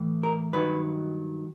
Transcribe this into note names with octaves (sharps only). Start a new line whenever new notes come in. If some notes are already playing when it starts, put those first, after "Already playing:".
Already playing: A2 E3
A#4
G2 D#3 F#3 B4